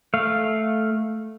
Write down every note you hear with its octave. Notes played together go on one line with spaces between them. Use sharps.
A3 F5